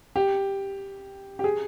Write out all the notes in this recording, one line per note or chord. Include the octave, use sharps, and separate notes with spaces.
G4
G4
G#4